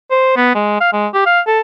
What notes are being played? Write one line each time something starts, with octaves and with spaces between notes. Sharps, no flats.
C5
B3
G#3
F5
G#3
G4
F5
A4